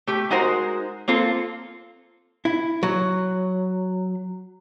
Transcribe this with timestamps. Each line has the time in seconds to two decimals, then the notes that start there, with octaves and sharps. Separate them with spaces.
0.07 A3 G4
0.30 G#3 D#4 F#4 A#4 C5
1.08 A#3 C4 F4 A4
2.45 E4
2.83 F#3